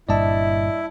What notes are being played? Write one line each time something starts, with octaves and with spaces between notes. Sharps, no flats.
G1 G2 A#2 E4 D5 D#5 A5